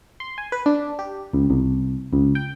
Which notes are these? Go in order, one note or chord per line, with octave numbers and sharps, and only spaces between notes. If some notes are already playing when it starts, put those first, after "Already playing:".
C6
G#5
B4
D4
G4
C#2
C2
C#2
G5